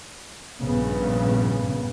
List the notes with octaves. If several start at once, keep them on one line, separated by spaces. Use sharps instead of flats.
A#1 G2 A#2 C#3 B3